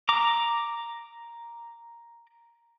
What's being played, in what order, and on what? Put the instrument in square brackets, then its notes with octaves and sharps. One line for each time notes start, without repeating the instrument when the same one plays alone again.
[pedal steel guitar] A#5 D6